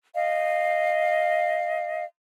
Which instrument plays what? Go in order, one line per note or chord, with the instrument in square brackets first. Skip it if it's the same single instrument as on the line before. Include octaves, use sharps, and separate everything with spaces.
[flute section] D#5 F5